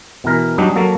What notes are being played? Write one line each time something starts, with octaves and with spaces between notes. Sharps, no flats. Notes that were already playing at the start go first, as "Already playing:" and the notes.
B2 E3 A#4
F#3 G3 D4 D#4
F#3 A#3 A4